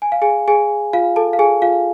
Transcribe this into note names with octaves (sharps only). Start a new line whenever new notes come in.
G#5
F5
G#4 G#5
G#4 G#5
F4 F5
A4 A5
F5
G#4 G#5
F4 F5